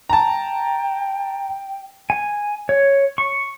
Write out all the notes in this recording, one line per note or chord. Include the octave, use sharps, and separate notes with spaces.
G5 A5 A#5
G#5
C#5
C#6